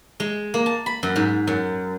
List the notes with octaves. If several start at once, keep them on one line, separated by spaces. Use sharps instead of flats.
G#3
A#3
A5
B5
F#2
G#2
F#2